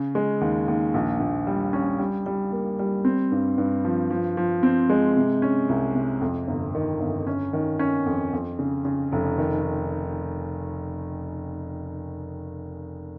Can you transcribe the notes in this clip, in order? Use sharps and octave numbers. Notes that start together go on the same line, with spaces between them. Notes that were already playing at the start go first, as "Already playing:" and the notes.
Already playing: C#3
G#3
D#2
D#2
A#1
A#1
G3
C#4
G3
G3
A#3
G3
C4
G2
G2
F3
F3
F3
C4
G#3
C3
C#4
C2
C3
F2
G1
D#3
G1
C#4
D#3
C#4
F2
F2
C#3
C#3
F1
D#3